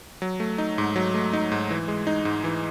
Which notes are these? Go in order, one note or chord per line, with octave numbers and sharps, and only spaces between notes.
F#3
A3
D#4
G#2
F#3
A3
D#4
G#2
E3
G#3
D#4
G#2
E3